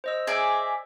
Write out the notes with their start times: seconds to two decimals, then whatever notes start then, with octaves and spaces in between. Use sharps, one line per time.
0.04 C5 D#5 E6
0.27 G#4 D5 E5